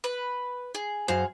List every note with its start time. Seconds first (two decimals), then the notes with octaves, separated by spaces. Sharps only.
0.04 B4
0.75 G#4
1.08 F#2 F#4 G#4 C5 F5